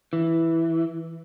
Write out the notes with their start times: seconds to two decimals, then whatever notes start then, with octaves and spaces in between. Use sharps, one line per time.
0.13 E3